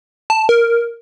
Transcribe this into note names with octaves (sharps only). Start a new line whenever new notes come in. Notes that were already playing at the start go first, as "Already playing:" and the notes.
A5
A#4